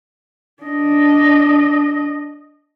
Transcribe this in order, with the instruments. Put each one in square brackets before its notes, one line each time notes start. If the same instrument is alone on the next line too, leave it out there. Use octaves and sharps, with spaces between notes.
[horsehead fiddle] D4 D#5